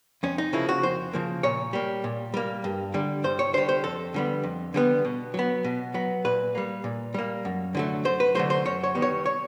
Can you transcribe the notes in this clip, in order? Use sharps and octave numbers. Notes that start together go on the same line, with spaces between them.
F2 C#4
D#4
C#3 F3 A#3 E4
F#4
F2 C5
C#3 F3 A#3
A#2 C#5
G3 A#3
A#2
G3 A#3
G2
D3 G3
G2 C5
C#5
D3 G3 C5
C5
F2 A4
D3 G3 B3
F2
D3 G3 B3
B2
F#3 B3
B2
F#3 B3
A#2 B4
G3 A#3
A#2
G3 A#3
F#2
D3 F#3 A3
F#2 C5
B4
D3 F#3 A3 C5
C5
F#2 C#5
C#5
D#3 G3 B3
C#5
C#5